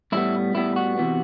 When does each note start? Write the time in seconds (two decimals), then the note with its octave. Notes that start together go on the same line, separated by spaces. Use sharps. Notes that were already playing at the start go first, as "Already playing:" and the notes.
0.12 A2 G3 B3 E4
0.54 A2 G3 B3 E4
0.76 F#4
0.98 C3 E3 B3